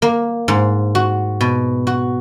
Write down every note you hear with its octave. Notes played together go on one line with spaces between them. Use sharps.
A#3
G#2
F#4
B2
F#4